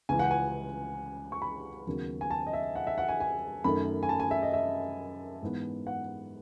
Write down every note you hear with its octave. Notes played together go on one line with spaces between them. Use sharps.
C#2 C#3 E3 G#5
F#5
G#5
C#6
B5
D#2 C#3 F#3 B3
G#5
A5
D#5
E5
F#5
E5
F#5
G#5
G#5
F#2 D#3 A3 B5
G#5
A5
G#5
E5
D#5
E5
G#2 E3 B3
F#5